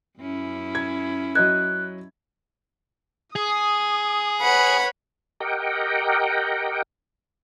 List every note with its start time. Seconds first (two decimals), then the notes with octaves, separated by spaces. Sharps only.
0.19 F#2 C#4 E4
0.75 G#6
1.35 F#3 D#5 F#6 G#6
3.36 G#4 D#6
4.41 B4 C#5 F#5 B5
5.40 G4 A#4 D#5 F#5 G5